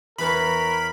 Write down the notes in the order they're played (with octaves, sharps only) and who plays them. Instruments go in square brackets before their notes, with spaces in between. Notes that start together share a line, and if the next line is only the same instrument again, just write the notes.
[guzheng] E2 B4 C#5 [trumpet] A#4 [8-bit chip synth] B5